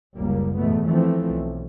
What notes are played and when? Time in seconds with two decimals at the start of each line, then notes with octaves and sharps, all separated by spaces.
0.16 F#1 C#2 G3 A#3
0.58 E2 G#2 B2 A3 B3
0.87 E3 F3 A3 C4
1.30 B1